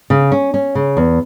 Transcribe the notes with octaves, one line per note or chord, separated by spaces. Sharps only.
C#3
C#4
C#4
C#3
E2